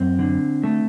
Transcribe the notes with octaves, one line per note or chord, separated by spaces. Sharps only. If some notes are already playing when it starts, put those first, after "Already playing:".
Already playing: F#2 C4
D3
A3